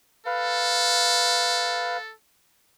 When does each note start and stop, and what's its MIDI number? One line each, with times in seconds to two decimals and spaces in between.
0.26 2.12 69
0.26 1.97 71
0.26 1.97 77